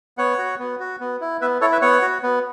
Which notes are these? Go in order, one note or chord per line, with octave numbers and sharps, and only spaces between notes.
B3 C#5 F#5
F#4
B3
F#4
B3
E4
B3 B4 E5
E4 A4 C#5
B4 E5
B3 C#5 F#5
F#4
B3